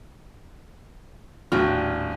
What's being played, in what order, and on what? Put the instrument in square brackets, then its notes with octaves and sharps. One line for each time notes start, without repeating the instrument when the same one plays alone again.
[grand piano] D#1 A2 F6 [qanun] D4 F#4 G5